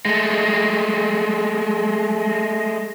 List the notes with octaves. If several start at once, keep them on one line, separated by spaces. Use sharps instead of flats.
G#3 A3